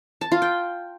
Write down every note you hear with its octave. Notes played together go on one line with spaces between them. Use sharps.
A5
F4
G5